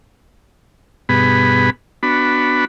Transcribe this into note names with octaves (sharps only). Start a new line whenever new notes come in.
G2 B2 B3 G#4 B5
B3 D4 F#4 B5